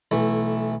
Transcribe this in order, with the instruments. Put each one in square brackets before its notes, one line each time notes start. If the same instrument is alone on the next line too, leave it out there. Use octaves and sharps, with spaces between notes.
[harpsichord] B1 E3 A3